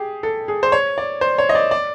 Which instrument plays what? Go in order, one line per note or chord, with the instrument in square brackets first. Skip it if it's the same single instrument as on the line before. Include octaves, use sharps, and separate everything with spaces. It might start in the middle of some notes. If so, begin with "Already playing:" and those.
Already playing: [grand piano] G4 G#4
A4
G#4
C5
C#5
D5
C5
C#5
D#5
D5
D5